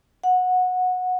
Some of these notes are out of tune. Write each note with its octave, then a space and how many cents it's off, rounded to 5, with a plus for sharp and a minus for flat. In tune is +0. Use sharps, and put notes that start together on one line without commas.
F#5 -15